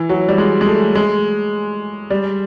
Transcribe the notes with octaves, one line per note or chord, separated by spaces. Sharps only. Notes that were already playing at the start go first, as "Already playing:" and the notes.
Already playing: E3
F#3
G3
G#3
G#3
A3
G#3
G3